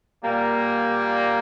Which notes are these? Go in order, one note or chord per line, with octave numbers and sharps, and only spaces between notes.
A#2 G3 A#3